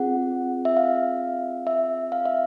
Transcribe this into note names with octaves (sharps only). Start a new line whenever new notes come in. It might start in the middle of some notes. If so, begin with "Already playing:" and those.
Already playing: C4 F4 G#4 F#5
E5
F5
E5
F5
E5